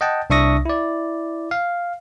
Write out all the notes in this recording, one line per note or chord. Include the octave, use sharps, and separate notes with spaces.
D#5 F#5 G5 A5
C2 D4 E5 C#6 D#6 A#6
E4 D5
F5